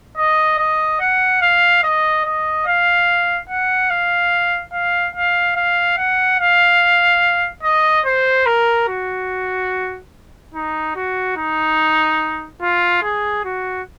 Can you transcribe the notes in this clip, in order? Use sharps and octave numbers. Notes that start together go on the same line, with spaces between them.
D#5
D#5
F#5
F5
D#5
D#5
F5
F#5
F5
F5
F5
F5
F#5
F5
D#5
C5
A#4
F#4
D#4
F#4
D#4
F4
G#4
F#4